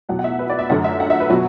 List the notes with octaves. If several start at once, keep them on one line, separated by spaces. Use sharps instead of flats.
E2 B2 F#3 F#5
F#5
E5
B4
D5
E5
F#2 D3 F#3 F#5
E5
F#5
E5
B4
B2 F#3 F#4